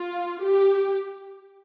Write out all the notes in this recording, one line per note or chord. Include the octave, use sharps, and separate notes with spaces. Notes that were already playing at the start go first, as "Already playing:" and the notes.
Already playing: F4
G4